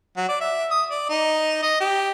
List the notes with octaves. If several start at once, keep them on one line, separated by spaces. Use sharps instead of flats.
F#3
D5
E5
D#6
D5
D#4
D#5
G4